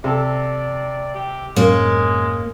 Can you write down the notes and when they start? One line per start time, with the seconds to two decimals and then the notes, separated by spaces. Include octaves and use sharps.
0.04 C3 A4 D5
1.15 G4
1.56 F#2 A2 G#3 A#3 B3 C#4